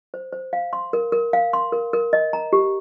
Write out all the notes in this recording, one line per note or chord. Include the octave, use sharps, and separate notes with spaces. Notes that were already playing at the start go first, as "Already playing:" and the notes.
C5
C5
F5
C6
A#4
A#4
F5
C6
A#4
A#4
D#5
A#5
G4